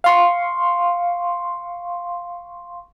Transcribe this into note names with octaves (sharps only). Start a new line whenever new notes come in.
F5 C6 C#6